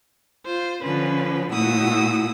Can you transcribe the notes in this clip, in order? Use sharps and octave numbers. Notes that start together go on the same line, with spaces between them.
F4 C5
D3 F3 C#4 B4
A#2 A3 E4 F#4 D#6 E6